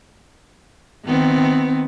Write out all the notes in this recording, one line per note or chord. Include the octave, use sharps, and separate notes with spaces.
D#3 B3 C4